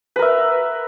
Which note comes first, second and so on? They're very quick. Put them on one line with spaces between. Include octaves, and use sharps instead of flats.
B4 A#4 E5